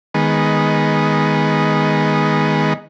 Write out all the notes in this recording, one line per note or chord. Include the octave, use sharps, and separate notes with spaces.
D#3 G#3 B3